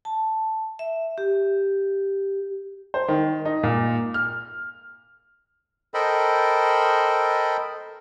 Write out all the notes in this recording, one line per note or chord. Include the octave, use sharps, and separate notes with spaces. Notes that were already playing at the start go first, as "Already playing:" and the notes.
A5
E5
G4
C5
D#3
D#4
A#2
F6
A4 A#4 C5 D#5 G5 B5